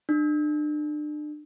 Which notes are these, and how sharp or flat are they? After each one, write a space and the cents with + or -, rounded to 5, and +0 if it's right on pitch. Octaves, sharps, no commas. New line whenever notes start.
D4 +35